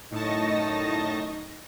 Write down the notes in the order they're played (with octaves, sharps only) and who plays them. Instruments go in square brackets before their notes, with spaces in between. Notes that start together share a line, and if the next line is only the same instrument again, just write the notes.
[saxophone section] F#2 D3 D#4 [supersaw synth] A2 A5 [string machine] D#5 C#6 A#6